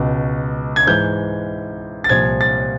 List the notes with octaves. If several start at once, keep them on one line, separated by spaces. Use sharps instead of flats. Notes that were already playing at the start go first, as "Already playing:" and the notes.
Already playing: C#2 B2
G#6
G#2 E3 G6
A6
C2 A#2 F3 G#6
A6